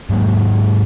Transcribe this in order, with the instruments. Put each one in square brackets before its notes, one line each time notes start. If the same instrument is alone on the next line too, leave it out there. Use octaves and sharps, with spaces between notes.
[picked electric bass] G#2 F#3 G#3 A#3